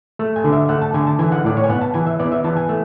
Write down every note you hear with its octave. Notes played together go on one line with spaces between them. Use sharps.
A3
G#5
D3
E5
A3 F#5
A5
D3 G#5
A5
E3 G#5
F#5
A2 D5
C#5
G#5
B3 F#5
A5
E3 G#5
E5
B3 D5
E5
E3 A5
G#5
A3